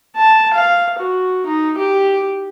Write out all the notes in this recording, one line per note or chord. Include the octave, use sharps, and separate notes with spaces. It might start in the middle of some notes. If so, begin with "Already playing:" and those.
A5
F5
F#4
D#4
G4